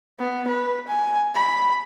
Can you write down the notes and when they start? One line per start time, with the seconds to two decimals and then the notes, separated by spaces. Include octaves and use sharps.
0.19 B3
0.48 B4
0.88 G#5
1.35 B5